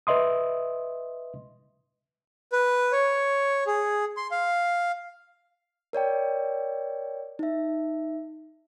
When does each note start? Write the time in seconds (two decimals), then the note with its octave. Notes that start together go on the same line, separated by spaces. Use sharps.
0.07 B4 D#5 E5 C6 D#6
2.52 B4
2.92 C#5
3.67 G#4
4.17 C6
4.31 F5
5.93 A#4 C#5 D5 G5
7.39 D#4 E5